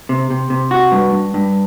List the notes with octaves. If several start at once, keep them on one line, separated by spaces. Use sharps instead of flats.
C3
C3
C3
F#4
G2
G2
G2